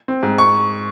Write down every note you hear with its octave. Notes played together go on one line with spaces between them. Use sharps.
C4
G#2
C#6